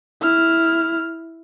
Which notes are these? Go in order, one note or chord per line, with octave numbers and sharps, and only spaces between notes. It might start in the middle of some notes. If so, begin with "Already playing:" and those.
E4 F6